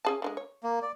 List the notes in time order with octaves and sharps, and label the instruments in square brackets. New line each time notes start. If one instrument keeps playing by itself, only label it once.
[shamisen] C#4 G#4 A5
D3 F3 G#3
C#5
[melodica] A#3
D5